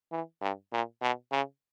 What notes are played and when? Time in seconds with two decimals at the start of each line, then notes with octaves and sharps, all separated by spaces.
0.12 E3
0.41 G2
0.72 A#2
1.02 B2
1.32 C#3